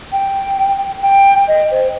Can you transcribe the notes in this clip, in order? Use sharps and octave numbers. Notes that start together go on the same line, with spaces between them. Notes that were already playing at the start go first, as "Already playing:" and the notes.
G5
G5
D#5
C5